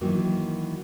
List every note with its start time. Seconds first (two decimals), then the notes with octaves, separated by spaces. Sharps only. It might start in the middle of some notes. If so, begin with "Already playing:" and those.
0.01 D#3 E3 F#3 A#3 F#4